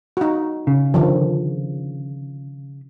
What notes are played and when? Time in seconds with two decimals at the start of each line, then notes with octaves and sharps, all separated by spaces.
0.17 D#4 F#4
0.67 C#3
0.94 D3 D#3 F3